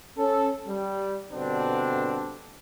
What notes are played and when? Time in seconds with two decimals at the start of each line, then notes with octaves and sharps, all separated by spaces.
0.18 C#4 A4
0.68 G3
1.32 G2 B2 D3 C4 D4